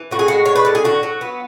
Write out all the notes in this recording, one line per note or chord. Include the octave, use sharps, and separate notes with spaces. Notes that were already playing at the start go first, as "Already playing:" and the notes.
Already playing: E3
A2 F#4
G#4
G#3 F#4
D4 C#5
B4
A2 A4
G#4
D3 F#4
F#3
B3